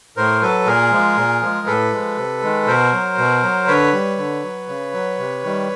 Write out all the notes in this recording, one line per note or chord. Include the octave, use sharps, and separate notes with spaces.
A2 A#4 C5
F#3 A4 B4
A#2 G#4 A#4
F3 G#3
A#2
F3 G#3
A2 A4 B4
F3 G#3
C3
D#3 G#3
B2 A#4 C5
F#3
B2
F#3
D3 B4 C#5
G3
D3
F#3
C#3
F#3
C3
D#3 G3